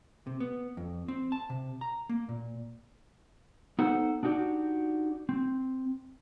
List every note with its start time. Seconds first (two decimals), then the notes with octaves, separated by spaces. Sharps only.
0.27 C3
0.40 B3
0.77 F2
1.08 C4
1.32 A5
1.50 C3
1.81 A#5
2.09 A#3
2.29 A#2
3.79 B3 D#4 A4 C5 F#5
4.23 D4 D#4 F#4 G4 D5
5.29 C4